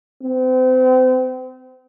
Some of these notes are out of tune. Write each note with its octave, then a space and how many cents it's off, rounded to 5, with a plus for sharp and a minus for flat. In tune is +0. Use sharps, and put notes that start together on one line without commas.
C4 -35